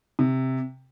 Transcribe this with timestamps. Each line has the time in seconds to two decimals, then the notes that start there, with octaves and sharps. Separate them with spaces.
0.19 C3